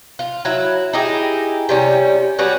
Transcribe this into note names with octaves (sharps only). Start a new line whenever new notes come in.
F4
F#3 E4
D#4 E4 G4 G#4
C3 G3 C#4
G3 C#4 F#4 B4